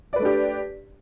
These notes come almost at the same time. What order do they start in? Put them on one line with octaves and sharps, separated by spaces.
D5 B4 A3 D4 G4